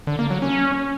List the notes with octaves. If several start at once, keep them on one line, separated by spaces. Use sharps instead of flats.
D3
A#3
F#3
C#4